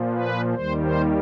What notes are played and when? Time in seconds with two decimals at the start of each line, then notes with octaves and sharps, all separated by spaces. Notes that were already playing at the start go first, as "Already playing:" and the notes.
Already playing: A#2 F3
0.11 B4
0.54 D#2 D#3 G3 C5
0.82 C5